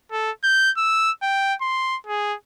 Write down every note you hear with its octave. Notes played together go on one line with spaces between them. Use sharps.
A4
G6
E6
G5
C6
G#4